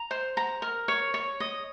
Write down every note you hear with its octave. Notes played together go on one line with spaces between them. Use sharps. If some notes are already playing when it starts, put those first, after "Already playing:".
Already playing: A#5
C5
A#5
A#4
C#5
C#5
D#5